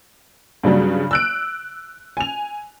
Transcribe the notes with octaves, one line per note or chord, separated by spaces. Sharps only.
G2 C#3 F#3 G3
E6 F#6 D7
G#5 F7